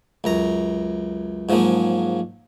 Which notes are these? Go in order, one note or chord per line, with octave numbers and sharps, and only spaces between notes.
C#2 F#2 A#5
G#2 F3 F#3 G#3 A#3